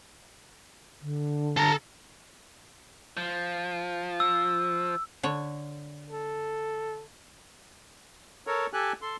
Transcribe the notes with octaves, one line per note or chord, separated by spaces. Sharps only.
D3
A4 A#5
F3
E6
D3 C#5
A4
A4 A#4 C#5
G4 A4 G#5 F#6
A4 C6